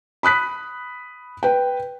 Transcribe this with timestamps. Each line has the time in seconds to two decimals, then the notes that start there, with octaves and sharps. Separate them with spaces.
0.23 B5 D#6 F#6 B6
1.43 B4 G5